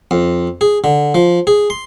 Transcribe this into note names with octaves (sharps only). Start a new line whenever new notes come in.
F2
G#4
D3
F3
G#4
C6